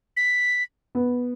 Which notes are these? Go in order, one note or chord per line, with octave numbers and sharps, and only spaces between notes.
B6
B3